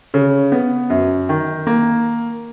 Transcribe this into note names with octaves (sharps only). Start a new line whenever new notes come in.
C#3
B3
F#2
D#3
A#3